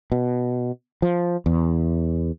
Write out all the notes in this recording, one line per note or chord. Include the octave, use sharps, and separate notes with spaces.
B2
F3
E2